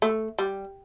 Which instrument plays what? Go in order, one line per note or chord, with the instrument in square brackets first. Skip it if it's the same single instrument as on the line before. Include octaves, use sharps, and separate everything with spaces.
[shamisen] A3
G3